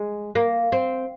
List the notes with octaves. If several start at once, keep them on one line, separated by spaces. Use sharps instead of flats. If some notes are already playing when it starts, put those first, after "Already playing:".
Already playing: G#3
A#3
C4